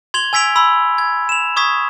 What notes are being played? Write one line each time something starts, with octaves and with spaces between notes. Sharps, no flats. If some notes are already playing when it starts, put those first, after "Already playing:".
C6 G#6 F7 G7
G#5 E6 G#6 B6 D7 F7
B5 C6 E6
G#6
E7 F7
C#6 D#6 G#6 B6